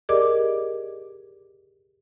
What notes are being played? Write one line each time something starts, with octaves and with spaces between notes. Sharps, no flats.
G4 G#4 A#4 D5 D#5 D6